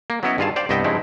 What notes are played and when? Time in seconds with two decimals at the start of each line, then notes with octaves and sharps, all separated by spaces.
0.10 A#3
0.23 F#3 B3 C#4 E4 C#5 D#5
0.38 G2 D#3 F4 G#4 F5 A5
0.56 C5 D5 F5 G5
0.69 C2 G2 B3 D#5 E5 G5
0.84 G2 C#3 F3 G#3 D#4 E4